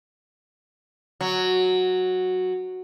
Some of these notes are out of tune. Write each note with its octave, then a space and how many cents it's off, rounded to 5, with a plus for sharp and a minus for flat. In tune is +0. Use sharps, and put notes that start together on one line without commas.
F#3 -5